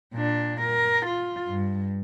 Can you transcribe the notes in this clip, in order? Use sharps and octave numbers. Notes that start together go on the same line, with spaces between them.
A#2 D4
A#4
F4
G2